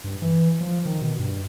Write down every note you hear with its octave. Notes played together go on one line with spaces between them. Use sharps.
G2
E3
F3
D#3
B2
G2